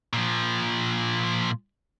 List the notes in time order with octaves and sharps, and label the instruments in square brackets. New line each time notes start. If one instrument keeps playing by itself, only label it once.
[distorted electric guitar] A#2 F3